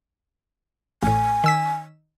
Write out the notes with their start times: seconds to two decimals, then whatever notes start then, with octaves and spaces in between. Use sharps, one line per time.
1.03 A1 A2 G#5
1.44 D#3 E6 B6